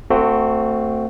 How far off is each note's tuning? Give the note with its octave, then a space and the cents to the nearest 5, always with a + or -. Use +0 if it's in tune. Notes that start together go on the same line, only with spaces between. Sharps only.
A3 +35 C4 +0 F#4 +0